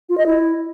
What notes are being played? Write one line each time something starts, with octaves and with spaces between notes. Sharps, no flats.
F4
D#5
E4